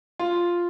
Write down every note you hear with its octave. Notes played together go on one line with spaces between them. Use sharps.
F4